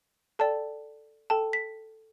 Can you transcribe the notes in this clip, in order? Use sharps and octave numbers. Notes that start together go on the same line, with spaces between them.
A4 D5 G5 A5
A4 G5 A5
B6